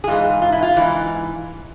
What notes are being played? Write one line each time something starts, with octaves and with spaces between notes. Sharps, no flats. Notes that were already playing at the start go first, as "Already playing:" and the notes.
G#4
G#2 E3 F4
F4
E4
F4
G#2 E3